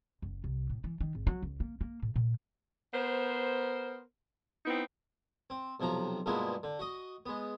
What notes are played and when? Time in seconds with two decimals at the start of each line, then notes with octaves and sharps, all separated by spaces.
0.22 F#1
0.44 C2
0.70 A2
0.84 E3
1.01 D#3
1.15 G#1
1.27 F#3
1.43 C#2
1.60 A#3
1.81 A#3
2.02 A2
2.16 A#2
2.93 B3 A#4 C5
4.66 B3 C4 D#4 E4
5.50 C4
5.80 B1 C3 F3 A#5
6.26 G2 B2 F3 G#3 A#3 E4
6.63 D3
6.79 F#4 D#5
7.26 G#3 B3